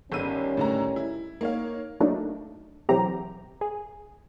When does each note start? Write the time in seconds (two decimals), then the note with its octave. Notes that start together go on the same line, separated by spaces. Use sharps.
0.12 G1 D#3 G3 C#4 E6 D#7
0.57 A2 D3 A#5
0.96 E4
1.41 A#3 D#4 C#5 F5
2.00 F#3 A3 A#3 D4 D#4
2.89 B2 E3 F#3 C4 G4 A#5
3.61 G#4